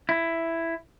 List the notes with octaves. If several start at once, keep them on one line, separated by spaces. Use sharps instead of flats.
E4